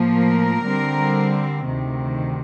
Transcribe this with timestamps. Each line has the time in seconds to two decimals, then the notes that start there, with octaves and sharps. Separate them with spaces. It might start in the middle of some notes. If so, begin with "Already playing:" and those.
Already playing: A2 F3 A#3
0.14 A#4
0.65 D3 G3 C4
1.65 D2 C3 D#3